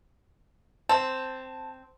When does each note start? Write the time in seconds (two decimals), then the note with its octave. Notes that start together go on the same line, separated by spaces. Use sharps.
0.89 C4 A5